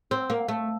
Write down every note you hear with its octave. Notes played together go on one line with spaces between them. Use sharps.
C4
A#3
A3